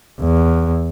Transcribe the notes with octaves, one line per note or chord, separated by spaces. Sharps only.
E2